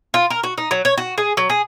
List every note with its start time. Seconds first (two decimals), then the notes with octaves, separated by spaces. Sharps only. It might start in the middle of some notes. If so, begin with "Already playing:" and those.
0.14 F4
0.30 A#4
0.43 F#4
0.58 D#4
0.71 F#3
0.85 C#5
0.98 F#4
1.18 G#4
1.37 F#3
1.50 G#4